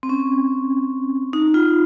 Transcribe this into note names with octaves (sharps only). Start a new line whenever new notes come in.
C4
C#4
D#4
F4